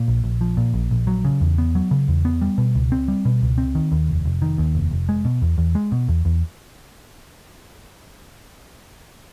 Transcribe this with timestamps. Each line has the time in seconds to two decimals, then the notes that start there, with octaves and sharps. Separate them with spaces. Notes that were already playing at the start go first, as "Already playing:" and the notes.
Already playing: A#2
0.08 A#1
0.24 A#1
0.41 F3
0.57 A#2
0.74 A#1
0.91 A#1
1.07 F#3
1.25 C#3
1.41 E2
1.58 B3
1.75 F#3
1.91 C#3
2.08 E2
2.25 B3
2.42 G3
2.58 B2
2.75 C#2
2.92 C4
3.08 G3
3.25 B2
3.42 C#2
3.58 C4
3.75 D#3
3.92 D#2
4.08 F1
4.26 F1
4.42 D#3
4.58 D#2
4.75 F1
4.91 F1
5.09 G#3
5.25 B2
5.42 E2
5.58 E2
5.75 G#3
5.92 B2
6.08 E2
6.25 E2